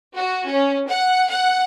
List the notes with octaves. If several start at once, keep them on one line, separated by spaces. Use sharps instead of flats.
F#4
C#4
F#5
F#5